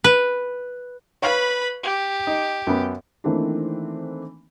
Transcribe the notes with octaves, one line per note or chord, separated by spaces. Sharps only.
B4
B4 C#5 F5 B5
G4
D#4
F#2 B3
D#3 E3 A3 A#3 C4 D4